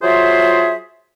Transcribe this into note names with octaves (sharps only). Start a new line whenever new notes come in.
F#3 F4 G#4 C5 E5